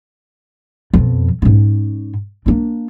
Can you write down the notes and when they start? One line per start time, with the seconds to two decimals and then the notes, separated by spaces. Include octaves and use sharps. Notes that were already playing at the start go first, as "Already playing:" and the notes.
0.94 F2 B2
1.42 G#2 C#4
2.46 A#3 D4